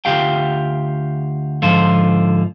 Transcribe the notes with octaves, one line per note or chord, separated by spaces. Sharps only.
D2 F4 G4 F5 G5
G#2 D3 F3 F4 C5